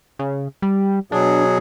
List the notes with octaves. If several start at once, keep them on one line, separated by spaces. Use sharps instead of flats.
C#3
G3
B2 F#3 D4 G#4